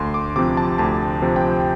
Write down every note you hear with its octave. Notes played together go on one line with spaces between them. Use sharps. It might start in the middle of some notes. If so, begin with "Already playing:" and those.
Already playing: D2 C6
D6
C3 F3 C4 D6
A5
D2 A5
C3 F3 C4
G5